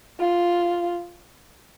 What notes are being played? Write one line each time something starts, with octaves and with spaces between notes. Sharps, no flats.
F4